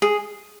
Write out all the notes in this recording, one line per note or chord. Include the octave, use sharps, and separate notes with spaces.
G#4